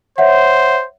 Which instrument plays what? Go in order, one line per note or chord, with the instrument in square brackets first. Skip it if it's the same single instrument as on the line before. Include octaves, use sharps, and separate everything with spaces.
[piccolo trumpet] C5 [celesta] C#5 E5 F#5